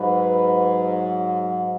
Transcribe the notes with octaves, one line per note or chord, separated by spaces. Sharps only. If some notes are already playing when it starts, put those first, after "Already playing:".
Already playing: G#2 F#3 B4